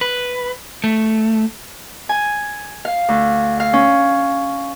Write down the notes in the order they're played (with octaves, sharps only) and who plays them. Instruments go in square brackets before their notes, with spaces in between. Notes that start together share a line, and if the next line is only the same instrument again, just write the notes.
[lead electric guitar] B4
A3
[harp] G#5
F5
D2
F5
C#4